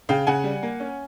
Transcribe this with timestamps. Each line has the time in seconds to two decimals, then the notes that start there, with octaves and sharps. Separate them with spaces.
0.09 C#3 F5 G5
0.27 C#3 F#5 G#5
0.44 G3
0.63 A#3
0.80 C#4